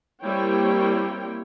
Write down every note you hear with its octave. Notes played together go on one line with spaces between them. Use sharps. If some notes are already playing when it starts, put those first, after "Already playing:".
G3 A#3 C4 E4 C#5 G5